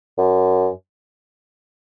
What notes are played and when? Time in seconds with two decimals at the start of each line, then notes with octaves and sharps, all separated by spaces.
0.18 F#2